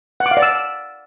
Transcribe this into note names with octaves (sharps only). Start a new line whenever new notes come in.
F#5
D6
F5
D5
E6